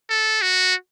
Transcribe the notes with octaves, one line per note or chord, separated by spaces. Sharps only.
A4
F#4